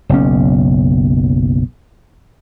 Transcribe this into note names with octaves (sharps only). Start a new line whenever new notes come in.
F#1 B1 C#4